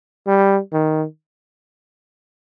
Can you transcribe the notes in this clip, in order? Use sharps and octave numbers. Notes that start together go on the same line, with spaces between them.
G3
D#3